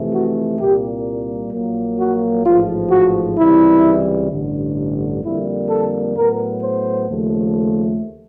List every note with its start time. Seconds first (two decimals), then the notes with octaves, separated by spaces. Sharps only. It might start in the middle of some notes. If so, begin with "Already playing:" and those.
Already playing: F2 C3 E3 A3
0.12 F#4
0.59 C2 A#2 G3 A#3 G4
1.52 A#1 A#2 F#3 A#3
1.99 F#4
2.45 A1 G#2 F3 F4
2.91 F#4
3.38 C#2 C3 E3 G3 E4
4.30 A1 G2 D3
5.23 F2 D3 G3 A#3 E4
5.70 A4
6.16 A2 F#3 B3 A#4
6.62 C5
7.09 D#2 C#3 F3 A3